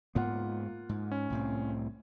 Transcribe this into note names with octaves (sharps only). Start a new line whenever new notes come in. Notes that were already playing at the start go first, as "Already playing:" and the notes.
G#2 A#3 B3 F4 F#5
G#2
C#4
C2 A2 C4